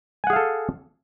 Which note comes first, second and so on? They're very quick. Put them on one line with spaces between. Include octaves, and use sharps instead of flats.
G#5 F#5 G#4 F5 A4